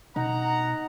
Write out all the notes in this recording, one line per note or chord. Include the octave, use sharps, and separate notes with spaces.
B2 D#4 F#5 A#5